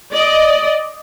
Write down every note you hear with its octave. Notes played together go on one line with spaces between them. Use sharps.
D5 D#5